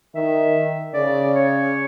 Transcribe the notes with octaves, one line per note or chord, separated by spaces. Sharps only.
D#3 E5
C#3 D5
C#5